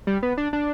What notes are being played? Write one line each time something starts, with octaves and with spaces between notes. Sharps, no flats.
G3
B3
D4
D4